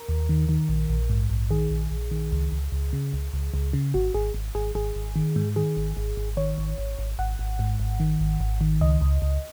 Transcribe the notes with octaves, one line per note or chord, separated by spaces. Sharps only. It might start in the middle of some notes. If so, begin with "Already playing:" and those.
Already playing: A#4
D#2
D#3
D#3
A#1
A#1
G#2
A#1
D#3 G#4
A#1
A#1
D#3
C#2
C#2
C#2
C#3
C#2
C#2
C#2
C#3
G#1 F#4
G#1 G#4
G#1
G#1 G#4
G#1 G#4
G#1
D#3
G#2
D#3 G#4
G#1
G#1
G#1
D#3 C#5
G#1
G#1
G#1
G#1 F#5
G#1
G#2
G#1
D#3
G#1
G#1
D#3
C#2 D#5
C#2
C#2